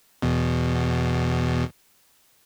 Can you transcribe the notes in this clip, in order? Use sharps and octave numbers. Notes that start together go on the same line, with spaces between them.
E2 B2